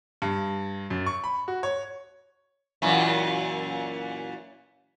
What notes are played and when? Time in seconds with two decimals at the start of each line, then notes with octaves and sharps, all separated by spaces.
0.22 G2
0.90 F#2
1.06 C#6
1.24 B5
1.48 F#4
1.63 C#5
2.82 F#2 A#2 E3